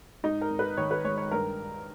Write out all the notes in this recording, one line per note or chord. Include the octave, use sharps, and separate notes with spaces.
G#2 D#4
A#4
G#1
B4
D#3 C#5
B4
G#3 C#5
C#5
G2 A#4